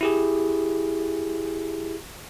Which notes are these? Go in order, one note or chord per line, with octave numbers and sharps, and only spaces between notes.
E4 G4 G#4